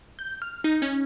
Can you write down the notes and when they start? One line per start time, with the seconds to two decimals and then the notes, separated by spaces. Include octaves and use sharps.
0.19 G6
0.42 F6
0.64 D#4
0.82 C#4